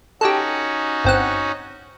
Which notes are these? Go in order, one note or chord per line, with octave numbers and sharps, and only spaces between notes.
C#4 D#4 F#4 G4 A4
G1 C4 F#5